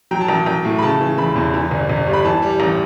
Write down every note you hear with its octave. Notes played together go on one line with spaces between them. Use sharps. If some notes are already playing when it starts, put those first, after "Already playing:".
F#3 G5
A5
A1 G5
A1 G5
A2
B5
C#3 A5
E3
E1 B5
E2
E3
G1
G1
G2
B5
E3 A5
G3
A1